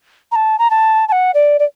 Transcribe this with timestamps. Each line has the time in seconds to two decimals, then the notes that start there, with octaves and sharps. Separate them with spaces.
0.32 A#5
0.35 A5
0.58 A#5
0.70 A5
1.08 A5
1.12 F#5
1.34 D5
1.59 D5